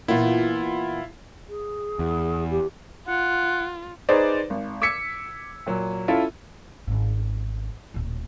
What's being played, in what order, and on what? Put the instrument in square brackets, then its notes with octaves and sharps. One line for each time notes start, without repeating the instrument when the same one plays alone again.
[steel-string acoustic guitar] A#2 E3 B3 [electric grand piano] E4 F4
[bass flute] G#4
[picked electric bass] E2
[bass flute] G4
[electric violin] F4 [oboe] F#5
[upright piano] D#4 G#4 B4 C5 D5
G#1
D6 E6 G#6 B6 C#7
A#2 F#3
C#4 E4 F4 A4
[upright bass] G#1 C#4
D1 A#2